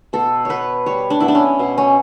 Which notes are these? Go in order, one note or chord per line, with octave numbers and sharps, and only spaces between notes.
B2 A4
B3 B4 C#5
G3 C#5
D4
B3 E4
D4
C#4
B2
C#4